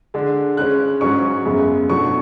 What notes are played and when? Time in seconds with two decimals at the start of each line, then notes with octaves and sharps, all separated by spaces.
0.14 D3 G#3 D4
0.57 C#3 G#3 C#4 F#6
1.01 G#2 F#3 C#4 C#6
1.45 F#2 C#3 G#3 B3
1.89 B2 F#3 A3 D4 C#6